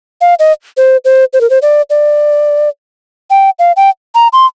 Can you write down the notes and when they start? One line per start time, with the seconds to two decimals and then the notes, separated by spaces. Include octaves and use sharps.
0.21 F5
0.39 D#5
0.77 C5
1.05 C5
1.33 C5
1.41 A#4
1.50 C5
1.62 D5
1.90 D5
3.30 G5
3.59 F5
3.77 G5
4.15 A#5
4.33 C6